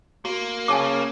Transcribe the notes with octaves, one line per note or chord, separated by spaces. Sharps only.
A#3 F#4
C#3 G#5 A5 D6